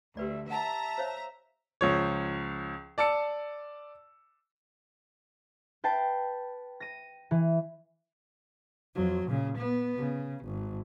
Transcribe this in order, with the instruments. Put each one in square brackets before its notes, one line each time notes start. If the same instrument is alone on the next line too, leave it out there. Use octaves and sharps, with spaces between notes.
[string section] D2 [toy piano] G4 B4 D5 [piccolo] E5
[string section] E5 A#5 [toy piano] F#5 [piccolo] A5
[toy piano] C5 C#5 F5
[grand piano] C#2 F3 C#5
D5 A5 E6 C#7
[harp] B4 G5 A5 C7
A#6 D#7
E3
[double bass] F2 F#3
A#2 C#3
B3
C#3
G#1